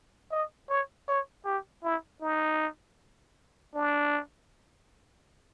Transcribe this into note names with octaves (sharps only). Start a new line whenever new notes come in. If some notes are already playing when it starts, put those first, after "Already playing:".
D#5
C#5
C#5
G4
E4
D#4
D4